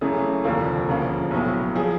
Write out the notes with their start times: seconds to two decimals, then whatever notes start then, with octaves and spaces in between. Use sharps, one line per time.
0.01 F#2 C#3 E3 A3 G#4
0.44 F1 D#2 D3 F3 A#3
0.88 E1 D2 C#3 F3 A#3
1.31 B1 A2 F#3 B3
1.75 F3 G#4